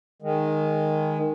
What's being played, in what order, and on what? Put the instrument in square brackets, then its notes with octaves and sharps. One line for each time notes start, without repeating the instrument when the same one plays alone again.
[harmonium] D#3 G#3